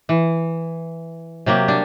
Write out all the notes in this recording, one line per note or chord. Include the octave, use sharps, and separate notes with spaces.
E3
C3 F#3 A#3 G4
G3 D4